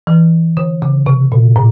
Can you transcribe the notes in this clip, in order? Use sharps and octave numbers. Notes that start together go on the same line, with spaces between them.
E3
D3
C#3
C3
A#2
A2